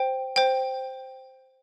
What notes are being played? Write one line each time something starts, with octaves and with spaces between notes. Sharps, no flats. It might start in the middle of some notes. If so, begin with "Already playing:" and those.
Already playing: C5 G5
C5 G5